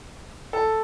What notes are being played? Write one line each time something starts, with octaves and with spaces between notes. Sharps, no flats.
A4